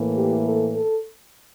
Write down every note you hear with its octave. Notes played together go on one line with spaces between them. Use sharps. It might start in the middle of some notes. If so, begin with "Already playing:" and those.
Already playing: A2 E3 A#3
G4
A4
A4